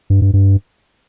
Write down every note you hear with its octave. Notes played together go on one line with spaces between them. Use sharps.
G2
G2
G2